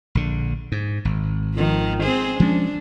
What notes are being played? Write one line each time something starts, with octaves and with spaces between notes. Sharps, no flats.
A#1 D3
G#2
G#1
D#3 F3
C4 G#4 C5
F3 G#3 C#4 D4